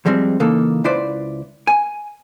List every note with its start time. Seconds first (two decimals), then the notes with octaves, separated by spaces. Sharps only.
0.06 F3 G3 G#3 C4
0.40 C#3 E3 A#3 D#4 A4
0.84 C#2 E4 B4 C5 D5
1.67 G#5